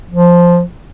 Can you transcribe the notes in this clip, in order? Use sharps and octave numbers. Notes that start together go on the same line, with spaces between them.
F3